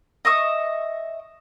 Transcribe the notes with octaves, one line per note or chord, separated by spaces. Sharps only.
D#5 E5 C#6 D#6